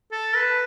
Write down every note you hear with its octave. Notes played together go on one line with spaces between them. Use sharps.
A4
B4